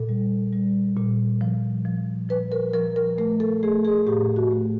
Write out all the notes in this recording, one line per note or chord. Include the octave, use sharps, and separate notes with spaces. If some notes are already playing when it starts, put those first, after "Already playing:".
Already playing: A#2 A4
G3
G3
A#2
F3
F3
F3 B4
A#4
F3 A#4
A#4
A3 A#4
A4
A3 G#4
G#4
A2 G4
F#4
A3